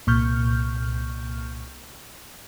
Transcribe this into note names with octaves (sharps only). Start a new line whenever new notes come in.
C2 A#2 C#6 F6 G6